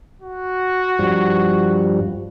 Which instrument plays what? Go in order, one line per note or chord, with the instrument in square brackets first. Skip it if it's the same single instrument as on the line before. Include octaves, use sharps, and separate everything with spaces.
[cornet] F#4
[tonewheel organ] G2 F3 G3